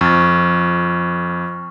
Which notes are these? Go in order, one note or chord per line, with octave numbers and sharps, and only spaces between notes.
F2 C#6 F6 A6